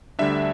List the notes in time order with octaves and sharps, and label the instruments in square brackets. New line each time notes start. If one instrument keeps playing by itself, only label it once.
[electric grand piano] D2 D3 G3 D4 E5